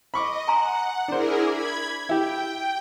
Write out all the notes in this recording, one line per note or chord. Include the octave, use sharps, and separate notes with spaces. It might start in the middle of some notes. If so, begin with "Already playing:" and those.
D#5 B5 C#6 D6
F#5 G#5 A#5 C6
D4 E4 G#4 A#4 C5
B5 D6 G#6
E4 G4 G5